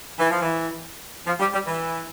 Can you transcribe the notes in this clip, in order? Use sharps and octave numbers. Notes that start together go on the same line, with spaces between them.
E3
F3
E3
F3
G3
G3
E3